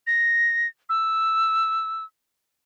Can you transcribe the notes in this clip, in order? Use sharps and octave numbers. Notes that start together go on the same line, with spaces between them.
A#6
E6